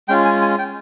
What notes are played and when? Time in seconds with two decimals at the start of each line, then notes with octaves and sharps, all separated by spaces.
0.08 G#3 C#4 F4 G5
0.25 G#5
0.42 G#5
0.59 G5